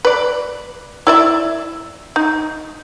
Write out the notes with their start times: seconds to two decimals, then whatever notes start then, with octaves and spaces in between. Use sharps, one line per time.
0.05 B4 D5
1.07 E4 D5 E5
2.16 D#4